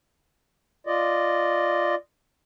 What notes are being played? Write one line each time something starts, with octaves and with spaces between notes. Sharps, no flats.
F4 D5 D#5